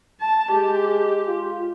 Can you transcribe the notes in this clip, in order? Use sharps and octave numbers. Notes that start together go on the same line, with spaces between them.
A5
G#3 G4
F4